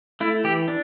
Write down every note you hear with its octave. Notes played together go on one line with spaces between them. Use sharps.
A3 E4
E3 G4
D4